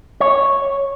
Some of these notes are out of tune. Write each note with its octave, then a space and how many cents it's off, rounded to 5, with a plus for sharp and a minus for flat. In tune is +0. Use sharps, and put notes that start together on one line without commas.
C#5 -5